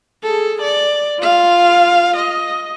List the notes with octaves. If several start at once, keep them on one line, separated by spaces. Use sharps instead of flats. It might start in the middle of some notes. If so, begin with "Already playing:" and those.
G#4 A4
D5
F4 F5
D#5